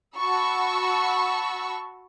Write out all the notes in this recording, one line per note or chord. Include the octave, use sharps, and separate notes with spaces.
F#4 A5 B5 C#6 E6